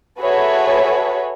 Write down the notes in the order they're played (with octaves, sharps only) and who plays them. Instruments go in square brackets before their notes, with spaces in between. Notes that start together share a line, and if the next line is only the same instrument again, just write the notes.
[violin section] F#4 G#4 A4 B4 C#5 E5